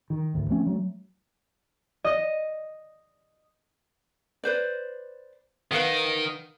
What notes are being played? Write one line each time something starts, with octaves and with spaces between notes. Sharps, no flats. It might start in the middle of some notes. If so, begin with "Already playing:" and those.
D#3
G#1 D2
F3 A3 C4 C#4
F#3 A3
D#5
B4 C5 D5
D#3 B4 F5 F#5